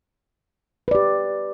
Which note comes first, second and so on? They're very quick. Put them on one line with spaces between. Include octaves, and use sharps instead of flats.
B4 D5 G4